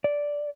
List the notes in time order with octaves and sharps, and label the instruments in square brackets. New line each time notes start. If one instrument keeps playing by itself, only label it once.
[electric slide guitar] D5